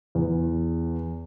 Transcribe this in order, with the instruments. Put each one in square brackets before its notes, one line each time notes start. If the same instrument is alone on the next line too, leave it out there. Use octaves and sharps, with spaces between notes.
[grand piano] E2